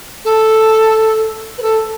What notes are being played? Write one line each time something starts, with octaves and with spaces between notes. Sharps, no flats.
A4
B4
A4